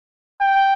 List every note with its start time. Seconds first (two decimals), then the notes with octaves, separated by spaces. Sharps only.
0.40 G5